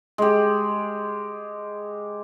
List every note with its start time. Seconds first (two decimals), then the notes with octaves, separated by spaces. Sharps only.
0.18 G#3 G4